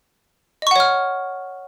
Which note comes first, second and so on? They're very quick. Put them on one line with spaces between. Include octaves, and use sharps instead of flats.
D#5 C#6 F#5 C#5 F6